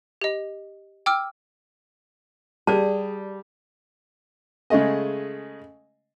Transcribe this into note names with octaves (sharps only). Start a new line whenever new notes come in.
G4 D#5
G5 D6 E6 F6
G3 G#4 D5 A5
C#3 G#3 A3 D#5